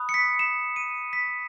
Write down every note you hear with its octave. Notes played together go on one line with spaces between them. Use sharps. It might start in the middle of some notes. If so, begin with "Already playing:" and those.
Already playing: B5 D#6 F#6
C#7
B6
E7
D#7
B6